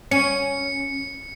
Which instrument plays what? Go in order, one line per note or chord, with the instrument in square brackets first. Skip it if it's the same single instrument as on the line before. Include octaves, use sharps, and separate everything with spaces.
[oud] C#4 [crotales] C#7